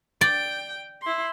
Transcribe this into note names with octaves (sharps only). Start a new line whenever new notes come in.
D5 G5
E4 C6